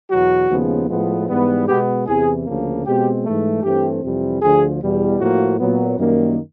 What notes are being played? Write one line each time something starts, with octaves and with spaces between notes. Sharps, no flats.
E2 B2 F#3 F#4
D#2 C#3 F3 G#3 B3
A2 F3 G#3 B3
G#2 E3 G3 B3
B2 G#3 B3 G4
E2 C3 E3 G#4
D2 C#3 F3 A#3
B2 G#3 C4 G4
G#2 E3 A3
G2 E3 A3 C4 G4
F2 C3 E3 G3
D2 D3 F3 G#4
E2 B2 G3
A2 F3 A#3 F#4
A#2 F#3 B3
F#2 D#3 G3 A#3